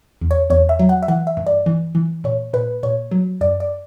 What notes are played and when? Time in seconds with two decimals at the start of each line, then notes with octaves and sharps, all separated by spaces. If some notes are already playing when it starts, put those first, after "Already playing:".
0.21 E2
0.31 C#5
0.50 E2 C#5
0.69 E5
0.79 F#3
0.89 F#5
1.03 E5
1.08 E3 F#5
1.27 E5
1.37 G2
1.47 D5
1.66 E3
1.95 E3
2.24 A#2 C#5
2.53 A#2 B4
2.83 A#2 C#5
3.11 F#3
3.41 F#2 D5
3.60 D5